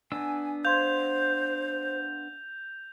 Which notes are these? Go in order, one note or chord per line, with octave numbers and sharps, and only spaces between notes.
B3 D4 G#5 E6
C5 F5 C6 G6 G#6 F7